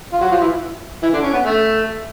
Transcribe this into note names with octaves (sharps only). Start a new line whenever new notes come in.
F4
F#3 F#4
F3 F4
E3 E4
E3 E4
D3 D4
C#4
B3
A3